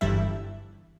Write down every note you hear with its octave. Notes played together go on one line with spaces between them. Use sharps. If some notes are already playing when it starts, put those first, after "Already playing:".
G1 G2 E3 G3 E4 E5